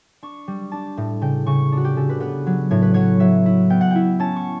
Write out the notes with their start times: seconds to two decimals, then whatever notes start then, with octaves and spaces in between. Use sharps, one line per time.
0.23 D4 C#6
0.48 G3
0.72 D4 A5
0.97 A2
1.21 C#3 G5
1.46 C#3 C#6
1.72 D4
1.77 F#4
1.85 G4
1.97 C#3 A4
2.09 B4
2.20 B3 B4
2.46 F#3
2.71 A2 C#5
2.82 B4
2.94 F#3 C#5
3.20 F#3 E5
3.46 E4
3.70 B3 G5
3.81 F#5
3.91 E4 G5
4.20 C#4 A5
4.36 C#6